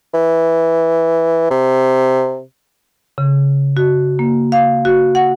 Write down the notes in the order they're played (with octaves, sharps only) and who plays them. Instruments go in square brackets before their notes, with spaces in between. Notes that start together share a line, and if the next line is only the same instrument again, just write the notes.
[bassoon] E3
C3
[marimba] C#3
F#4
A#3
F5
F#4
F#5